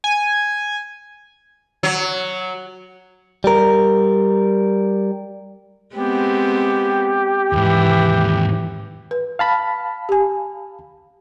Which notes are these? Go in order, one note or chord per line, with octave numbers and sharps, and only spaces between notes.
G#5
F#3
G3 A#4
G#3 B3 C4 G4
D#2 G#2 E3
B4
F5 A5 B5
G4 G#5